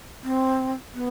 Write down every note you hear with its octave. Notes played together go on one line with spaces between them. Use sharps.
C4
B3